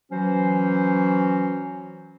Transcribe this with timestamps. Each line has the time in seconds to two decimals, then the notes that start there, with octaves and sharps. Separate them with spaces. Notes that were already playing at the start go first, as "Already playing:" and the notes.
0.11 E3 F#3 C#4 F#4 C5